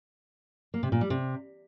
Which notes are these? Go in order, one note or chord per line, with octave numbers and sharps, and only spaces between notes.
A#3
C3
A#2
G3
C3